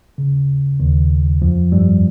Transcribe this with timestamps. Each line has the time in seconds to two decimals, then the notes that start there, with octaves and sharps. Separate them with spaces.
0.18 C#3
0.80 D#2 D#3
1.42 F2 F3
1.72 G2 G3